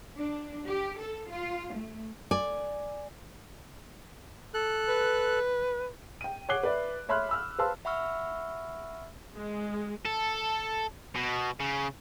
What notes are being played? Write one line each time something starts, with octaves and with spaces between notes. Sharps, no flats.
D4
G4
A4
F4
A3
D5 G#5
A4 F#6
B4
G5 D#7
C#5 F#5 D6 F#6 C7 G7
B4 D5 E5
C#5 E5 B5 C6 F6 F#6
B5 E6 F6
B4 C5 F5 A5 C6 E6
E5 F#5 B5 C#6 E6 F6
G#3
A4
B2
C#3